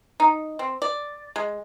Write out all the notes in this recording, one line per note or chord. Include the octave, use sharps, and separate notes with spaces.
D#4
C4
D5
G#3